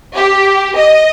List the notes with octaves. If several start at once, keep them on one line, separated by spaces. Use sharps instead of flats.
G4
D#5